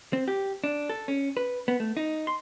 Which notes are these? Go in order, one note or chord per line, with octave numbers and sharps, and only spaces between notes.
C4
G4
D4
A4
C#4
B4
B3
A3
D#4
C6